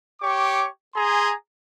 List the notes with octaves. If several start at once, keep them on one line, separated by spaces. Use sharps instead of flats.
G4 C#5 C#6 D6
G#4 G#5 A#5 C6